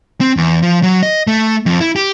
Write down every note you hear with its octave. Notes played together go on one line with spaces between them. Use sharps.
C4
E2
F3
F#3
D#5
A3
F2
E4
G4